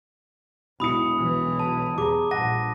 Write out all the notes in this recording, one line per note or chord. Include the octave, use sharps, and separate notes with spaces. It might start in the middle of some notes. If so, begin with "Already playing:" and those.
E1 B1 E4 B5 D#6 C#7
B1 E3
A5
E2 G#4 A#5 D6
A#1 G2 F#5 A5 A#6